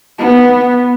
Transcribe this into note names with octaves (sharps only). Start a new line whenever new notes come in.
B3